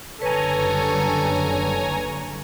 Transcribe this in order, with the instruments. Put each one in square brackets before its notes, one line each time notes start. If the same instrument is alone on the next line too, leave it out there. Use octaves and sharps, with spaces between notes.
[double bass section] F#1 D3 G3 [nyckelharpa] A4 [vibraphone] B4 [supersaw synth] C#5 G#5 A#5